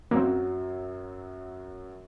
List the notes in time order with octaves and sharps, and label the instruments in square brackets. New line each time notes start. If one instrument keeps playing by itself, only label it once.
[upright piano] F#2 F#3 [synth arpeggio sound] A#3 C4